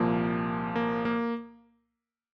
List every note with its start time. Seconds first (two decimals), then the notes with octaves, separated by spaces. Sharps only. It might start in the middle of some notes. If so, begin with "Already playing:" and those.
Already playing: C2 A#2 F3 A#3
0.76 A#3
1.05 A#3